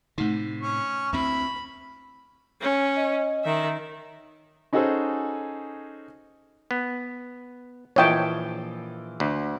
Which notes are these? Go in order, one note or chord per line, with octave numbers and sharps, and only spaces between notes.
A2 C3 A3 D#4
C#4 C#6
D2 C4 E4 B5
C#4
D#5
D#3 E5
C#4 D#4 F#4 G#4 A4 C5
B3
A#1 E3 E4 F4 C#5 D#5 G5 A5
D2